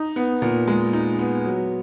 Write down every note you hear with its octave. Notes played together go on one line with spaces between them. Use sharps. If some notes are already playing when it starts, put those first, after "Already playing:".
Already playing: D#4
B3
A#2
G#3
D#4
B3
F#3